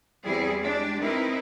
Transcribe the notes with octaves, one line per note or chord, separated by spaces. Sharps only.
E2 G3 C4 E4 G#4
G#3 D4 G4
C4 D#4 E4 A#4 B4 D#5